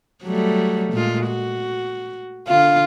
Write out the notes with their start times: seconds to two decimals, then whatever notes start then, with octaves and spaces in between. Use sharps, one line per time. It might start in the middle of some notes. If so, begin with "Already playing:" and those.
0.23 F#3 G3 A3
0.93 A#2 G#3 F4
1.26 F#4
2.48 D3 F4 F5